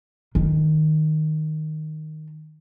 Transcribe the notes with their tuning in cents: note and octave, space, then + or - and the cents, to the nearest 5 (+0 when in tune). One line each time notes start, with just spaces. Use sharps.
D#3 -5